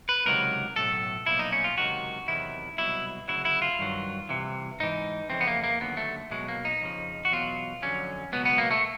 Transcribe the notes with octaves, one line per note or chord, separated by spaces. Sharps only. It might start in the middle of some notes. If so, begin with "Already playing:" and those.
B4
C#2 C3 D#3 F#3 A#4
B1 A2 F#3 A4
B1 A#2 F3 E4
D#4
C#4
F4
C#2 C3 D#3 F#3 F#4
E2 C3 D#3 F#3 E4
C2 B2 F#3 E4
D2 C#3 F#3 E4
E4
F4
G2 D#3 F#3
C2 C3 E3
G#2 E3 D#4
F2 C#3 E3 C4
B3
A#3
A#3
D#2 D3 F#3 B3
A3
B1 B2 F#3 G#3
A#3
D#4
F2 C#3 F3
F#4
E2 B2 F#3 F4
F2 D3 F#3 C#4
C#2 B2 F#3 B3
B3
A#3
A3